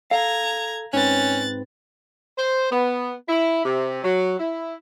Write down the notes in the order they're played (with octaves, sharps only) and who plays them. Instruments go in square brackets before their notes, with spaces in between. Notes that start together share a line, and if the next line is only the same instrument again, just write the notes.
[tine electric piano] A4 [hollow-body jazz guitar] F5 [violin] A#5 G#6
[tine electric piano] G#2 C4 B4 [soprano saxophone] C#4 [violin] F#6 A6
[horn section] C5
B3
E4
C3
F#3
E4